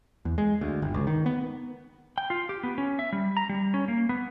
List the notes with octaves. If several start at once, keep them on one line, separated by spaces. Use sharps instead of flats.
E2
G#3
D2
G1
C#2
D#3
B3
G5
F4
G4
B3
C#4
E5
G3
A#5
G3
C#4
A#3
B3